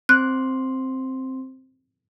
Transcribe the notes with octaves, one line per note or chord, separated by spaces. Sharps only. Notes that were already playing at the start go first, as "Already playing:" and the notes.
C4 C6 F#6